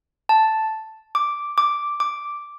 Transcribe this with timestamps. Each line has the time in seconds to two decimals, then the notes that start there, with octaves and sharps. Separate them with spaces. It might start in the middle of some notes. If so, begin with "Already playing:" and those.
0.29 A5
1.15 D6
1.58 D6
2.00 D6